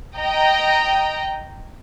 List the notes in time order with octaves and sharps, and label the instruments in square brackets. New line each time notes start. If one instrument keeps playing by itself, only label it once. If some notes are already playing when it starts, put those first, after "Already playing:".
[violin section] D#5 G5 A#5